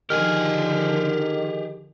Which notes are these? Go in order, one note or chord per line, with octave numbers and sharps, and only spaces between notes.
D3 D#3 F3 G4 G#4 G#5 F6